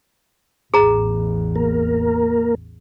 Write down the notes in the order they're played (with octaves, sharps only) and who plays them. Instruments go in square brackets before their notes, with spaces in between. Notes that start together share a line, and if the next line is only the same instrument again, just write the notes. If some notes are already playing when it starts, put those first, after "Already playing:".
[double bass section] A1 E2 [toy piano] G#4 A#5
[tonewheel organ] A#3 A#4